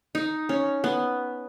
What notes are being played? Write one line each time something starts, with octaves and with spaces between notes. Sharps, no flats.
D#4
C#4
B3